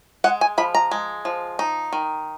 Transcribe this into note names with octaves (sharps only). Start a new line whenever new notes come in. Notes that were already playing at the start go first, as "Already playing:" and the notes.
G#3 F#5
G#5
F3 B5
A#5
G#3
F3
D#4
D#3